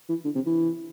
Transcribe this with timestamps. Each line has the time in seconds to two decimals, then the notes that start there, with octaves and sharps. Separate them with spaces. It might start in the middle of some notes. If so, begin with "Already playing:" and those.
0.09 E3
0.25 D3
0.35 C3
0.47 E3